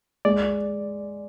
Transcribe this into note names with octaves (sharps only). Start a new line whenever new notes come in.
G#3 D5